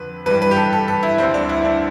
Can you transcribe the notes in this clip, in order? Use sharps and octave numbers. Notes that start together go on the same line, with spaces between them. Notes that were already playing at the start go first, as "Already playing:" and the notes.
Already playing: F2 D3 F3 B4
G2 E3 G3 B4
B4
G4
A4
A4
A4
E4
D2 D3 G3 C4
D4
E4
D4